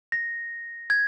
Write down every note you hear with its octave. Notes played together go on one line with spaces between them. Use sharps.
A#6
G#6